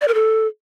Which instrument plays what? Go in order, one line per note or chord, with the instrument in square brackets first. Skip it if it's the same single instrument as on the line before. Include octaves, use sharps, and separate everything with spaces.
[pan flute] D5
A#4
A4